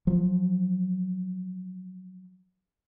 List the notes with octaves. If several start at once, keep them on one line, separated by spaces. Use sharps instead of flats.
F3 F#3